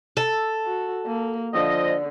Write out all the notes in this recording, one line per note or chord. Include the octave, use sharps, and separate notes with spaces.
A4
F#4
A#3
D3 F3 D#5